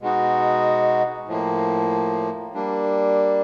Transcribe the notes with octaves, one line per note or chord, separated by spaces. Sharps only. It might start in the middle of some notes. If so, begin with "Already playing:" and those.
B2 G#3 B3 D#4 F#4
A2 F3 A#3
G3 A#3 D4